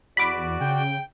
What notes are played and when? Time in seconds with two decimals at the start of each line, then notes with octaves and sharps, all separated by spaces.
0.17 E2 F#4 D5 B5 D6
0.61 C#3 G5